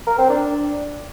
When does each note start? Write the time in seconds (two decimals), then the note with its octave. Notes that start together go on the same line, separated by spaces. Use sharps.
0.07 A#4
0.18 C4
0.30 D4